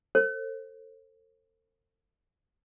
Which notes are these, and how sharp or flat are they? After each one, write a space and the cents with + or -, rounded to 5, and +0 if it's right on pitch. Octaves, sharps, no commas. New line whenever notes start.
A4 +35 C5 +30